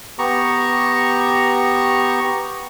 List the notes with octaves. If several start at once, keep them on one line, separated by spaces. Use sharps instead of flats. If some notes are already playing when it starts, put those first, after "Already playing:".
B3 G4 A#5 C#6